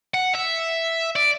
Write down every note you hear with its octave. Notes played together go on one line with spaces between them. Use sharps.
F#5
E5
D5